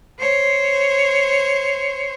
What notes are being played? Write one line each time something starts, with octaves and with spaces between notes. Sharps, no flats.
C5 C#5